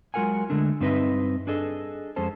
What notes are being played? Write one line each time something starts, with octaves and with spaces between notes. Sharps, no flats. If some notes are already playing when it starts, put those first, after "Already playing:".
F#3 G#3 F4 A#4 F#5 G#5
D3 G#3 A3 D4
G2 C4 D#4 B4 D#5 E5
D4 G#4 A4 D#5
F2 G#3 C#4 A4 C5 A5